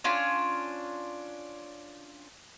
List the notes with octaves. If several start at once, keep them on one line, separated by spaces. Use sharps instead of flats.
C#4 D4 F4